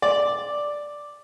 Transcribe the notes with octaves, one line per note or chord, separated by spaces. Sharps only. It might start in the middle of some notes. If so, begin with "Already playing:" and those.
D5